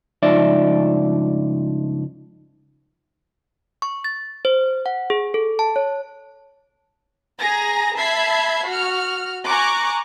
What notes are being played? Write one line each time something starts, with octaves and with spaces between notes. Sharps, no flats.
C#2 G2 F3 D#4 D5 E5
C#6
A6
C5
F#5
G#4
A4
A5
C#5
G#4 G#5 A#5 A#6
E5 A5 B5 G#6 B6 C7
F#4 F6
G#5 A#5 C#6 D6 F#6